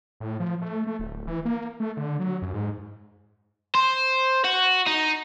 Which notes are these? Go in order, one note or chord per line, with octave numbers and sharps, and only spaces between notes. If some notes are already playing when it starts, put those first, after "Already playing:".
A2
F3
A3
A3
D1
E3
A#3
A3
D3
F#3
F#2
G#2
C5
F#4
D#4